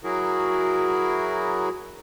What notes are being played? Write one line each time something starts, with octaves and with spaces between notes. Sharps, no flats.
F#3 E4 F#4 G#4 A#4